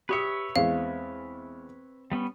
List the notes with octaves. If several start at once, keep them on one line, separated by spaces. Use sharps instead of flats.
G4 B4 C#5 E5 D#6 C#7
E2 G#3 C4 F5
G3 B3 C#4